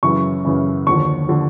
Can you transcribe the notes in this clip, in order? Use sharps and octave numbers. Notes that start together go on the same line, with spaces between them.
F#2 C#3 E3 C#6
F#2 C#3 E3
D#2 D3 F3 C#6
D3 F3